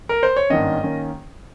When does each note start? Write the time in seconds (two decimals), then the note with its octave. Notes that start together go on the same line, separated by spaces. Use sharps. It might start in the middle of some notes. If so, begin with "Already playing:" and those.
0.09 A#4
0.23 C5
0.37 C#5
0.50 G#1 G2 D#3 A#3 C#4 D#5
0.83 D#3 A#3 C#4